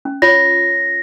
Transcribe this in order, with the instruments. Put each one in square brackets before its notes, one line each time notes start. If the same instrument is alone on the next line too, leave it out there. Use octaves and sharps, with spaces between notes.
[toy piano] C#4
[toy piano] F4 C#5 [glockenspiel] A#6